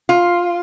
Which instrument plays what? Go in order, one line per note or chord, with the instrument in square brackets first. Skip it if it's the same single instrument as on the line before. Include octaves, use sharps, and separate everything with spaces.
[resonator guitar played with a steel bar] F4